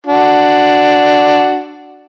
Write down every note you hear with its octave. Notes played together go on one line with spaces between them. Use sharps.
D4 F#4